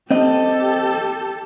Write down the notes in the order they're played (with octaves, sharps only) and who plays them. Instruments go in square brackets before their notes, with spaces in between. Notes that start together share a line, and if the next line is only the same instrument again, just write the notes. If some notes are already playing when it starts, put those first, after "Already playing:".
[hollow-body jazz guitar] C4 D#5 [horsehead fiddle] G4 A4